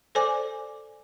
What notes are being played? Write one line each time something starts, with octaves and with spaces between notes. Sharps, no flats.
A4 C5 D5 G#5 D6